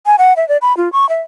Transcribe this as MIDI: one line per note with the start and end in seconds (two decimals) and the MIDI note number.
0.06 0.16 80
0.18 0.34 78
0.37 0.47 76
0.48 0.57 74
0.62 0.76 83
0.77 0.91 65
0.92 1.08 85
1.09 1.21 76